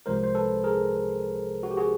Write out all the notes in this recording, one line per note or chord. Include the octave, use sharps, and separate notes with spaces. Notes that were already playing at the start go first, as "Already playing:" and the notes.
C2 C3 F3 G#3 A#4 C5
C5
A4 B4
G#4 A#4
F#4
G4
F#4 G#4